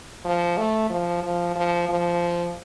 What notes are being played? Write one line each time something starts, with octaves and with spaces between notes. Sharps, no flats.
F3
A3
F3
F3
F3
F3